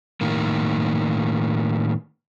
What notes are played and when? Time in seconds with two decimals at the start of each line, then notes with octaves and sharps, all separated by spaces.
0.21 A2 D#3 A#3